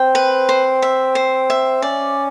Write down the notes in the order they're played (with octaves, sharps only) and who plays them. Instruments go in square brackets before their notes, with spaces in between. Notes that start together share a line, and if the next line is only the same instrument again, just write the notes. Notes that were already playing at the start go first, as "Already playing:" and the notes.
Already playing: [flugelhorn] C4 [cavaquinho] G5
[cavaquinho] B4
C5
E5
C5
E5
[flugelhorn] C#4 [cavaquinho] D5